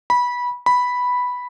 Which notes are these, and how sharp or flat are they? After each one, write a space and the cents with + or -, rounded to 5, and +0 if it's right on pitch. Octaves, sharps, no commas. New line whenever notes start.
B5 -15
B5 +0